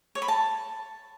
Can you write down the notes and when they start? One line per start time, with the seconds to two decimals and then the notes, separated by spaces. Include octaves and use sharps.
0.15 C#5
0.22 B5
0.28 A5